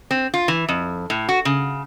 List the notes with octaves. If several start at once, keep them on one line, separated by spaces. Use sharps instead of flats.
C4
F4
E3
F2
A2
F#4
C#3